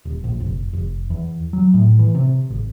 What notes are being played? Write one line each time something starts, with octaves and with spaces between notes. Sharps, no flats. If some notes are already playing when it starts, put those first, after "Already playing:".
D#1
A#1
F1
F1
E2
F#3
A2
E3
C3
G#1